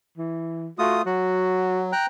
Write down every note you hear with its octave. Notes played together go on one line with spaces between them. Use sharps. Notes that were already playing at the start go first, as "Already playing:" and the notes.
E3
A3 F4 F#4 D#6
F#3 F#4
G5 A#5 F#6